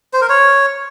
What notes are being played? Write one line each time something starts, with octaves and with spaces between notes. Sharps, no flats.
C5
A#4
C#5